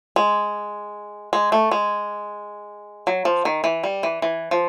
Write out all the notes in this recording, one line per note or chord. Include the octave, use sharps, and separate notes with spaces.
G#3
G#3
A3
G#3
F#3
F3
D#3
E3
G3
E3
E3
F3